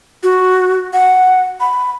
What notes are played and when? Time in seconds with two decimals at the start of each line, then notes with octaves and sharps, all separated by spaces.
0.23 F#4
0.93 F#5
1.60 B5